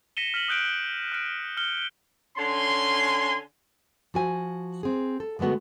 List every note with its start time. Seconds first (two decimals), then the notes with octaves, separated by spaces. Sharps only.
0.17 A#6 B6 C#7 D#7 E7 G7
0.34 F6 B6 D#7 F#7
0.48 D#6 F#6 G6 D7
1.12 F6 F#6 D7
1.57 F6 C#7 G7
2.36 D3 C#4 G#5 C6
4.14 F3 F#4 G#5
4.83 C4 G#4
5.20 A4
5.39 D3 G#3 A3 B3 F#4